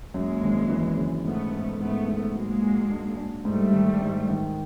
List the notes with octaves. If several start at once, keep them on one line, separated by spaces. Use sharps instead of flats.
F#2 G#3 A#3
G#1
E3
C#3
G#2 A3 B3
G#2
G#2 A3 B3
G#2
F#3 G#3 A#3
F#3
D4
D4
G#2 G3 A3
D#3
G#2
D#3